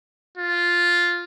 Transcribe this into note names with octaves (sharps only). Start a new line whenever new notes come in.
F4